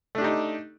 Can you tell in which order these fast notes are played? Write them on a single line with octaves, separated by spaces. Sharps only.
A3 D4 G4 D#4